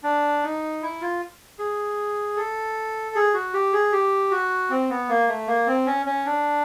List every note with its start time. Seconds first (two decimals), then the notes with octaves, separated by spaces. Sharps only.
0.03 D4
0.43 D#4
0.82 E4
1.01 F4
1.59 G#4
2.36 A4
3.15 G#4
3.34 F#4
3.54 G4
3.73 G#4
3.92 G4
4.31 F#4
4.70 C4
4.90 B3
5.09 A#3
5.28 A3
5.47 A#3
5.67 C4
5.86 C#4
6.06 C#4
6.25 D4